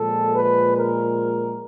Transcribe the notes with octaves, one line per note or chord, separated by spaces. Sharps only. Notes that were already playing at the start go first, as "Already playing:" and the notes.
Already playing: A#2 F3 G#3 A4
B4
A#4